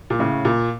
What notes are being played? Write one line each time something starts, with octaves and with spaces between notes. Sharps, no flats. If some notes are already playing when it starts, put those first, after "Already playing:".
A#2
A2 C#3
A#2